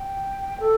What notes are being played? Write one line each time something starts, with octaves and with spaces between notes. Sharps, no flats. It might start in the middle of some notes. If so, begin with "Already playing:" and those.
Already playing: G5
A4